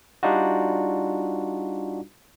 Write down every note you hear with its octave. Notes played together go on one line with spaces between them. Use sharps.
G3 D4 D#4 F4 F#4